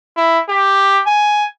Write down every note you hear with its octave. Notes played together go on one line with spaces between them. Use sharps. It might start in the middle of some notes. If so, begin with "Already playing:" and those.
E4
G4
G#5